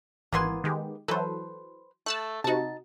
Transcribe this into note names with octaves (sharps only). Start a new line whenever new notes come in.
G#1 E3 A#3 B3 G#5 C6
D#3 G#3 G4
E3 F#3 A4 B4 C5
A3 A5 E6 F#6
C3 D#4 F#4 A5